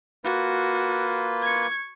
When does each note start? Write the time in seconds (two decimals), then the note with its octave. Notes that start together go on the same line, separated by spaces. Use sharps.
0.24 A#3 F4 F#4 B4
1.42 C#6 G#6